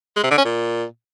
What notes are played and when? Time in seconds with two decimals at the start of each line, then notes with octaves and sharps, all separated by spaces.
0.16 G#3
0.23 C3
0.30 D3
0.38 C#4
0.45 A#2